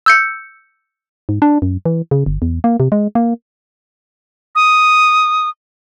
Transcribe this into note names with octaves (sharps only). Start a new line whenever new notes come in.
E6 G6 C#7
G#2
D4
F#2
E3
C#3
G1
E2
A#3
C3
G#3
A#3
D#6